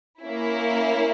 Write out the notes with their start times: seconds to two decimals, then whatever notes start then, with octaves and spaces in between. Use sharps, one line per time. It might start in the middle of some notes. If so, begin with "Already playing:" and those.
0.21 A#3 C#4 E4